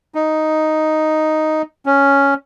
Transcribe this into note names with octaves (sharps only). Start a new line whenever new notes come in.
D#4
C#4